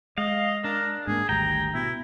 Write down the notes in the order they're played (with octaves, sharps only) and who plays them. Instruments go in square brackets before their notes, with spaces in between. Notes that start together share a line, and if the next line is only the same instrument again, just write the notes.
[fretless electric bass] G#3 [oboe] D#5 [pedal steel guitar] F5
[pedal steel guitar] D4 [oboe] A#4
[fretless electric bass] G#2 A3 A#3 [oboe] G#4
[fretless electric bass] G#1 D2 G3 [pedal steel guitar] G5 [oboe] A#5
[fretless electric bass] B2 [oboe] E4